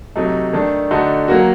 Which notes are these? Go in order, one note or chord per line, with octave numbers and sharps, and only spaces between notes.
C3 F#3 A3 D#4
D#3 A3 D4
D3 A3 D#4 F#4
F#3 A#3 F#4